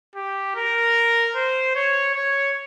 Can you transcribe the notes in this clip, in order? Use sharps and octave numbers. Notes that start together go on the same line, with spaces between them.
G4
A#4
C5
C#5
C#5